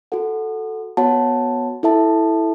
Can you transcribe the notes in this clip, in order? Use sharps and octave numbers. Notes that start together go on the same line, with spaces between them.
F#4 A4 F#5
B3 F#4 C#5 F#5 A5
E4 A4 E5 A5